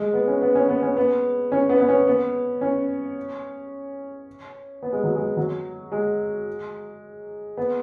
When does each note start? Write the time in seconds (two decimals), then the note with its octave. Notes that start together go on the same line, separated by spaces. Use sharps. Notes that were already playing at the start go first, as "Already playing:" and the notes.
Already playing: G#3
0.14 B3
0.27 C#4
0.41 B3
0.55 C#4
0.69 B3
0.82 C#4
0.97 B3
1.52 C#4
1.69 B3
1.80 B3
1.88 C#4
2.07 B3
2.61 C#4
4.83 B3
4.93 G#3
5.04 F#3
5.15 G#3
5.37 F#3
5.92 G#3
7.57 B3